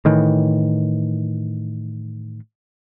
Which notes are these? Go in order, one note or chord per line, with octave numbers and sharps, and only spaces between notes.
A2 D#3 E3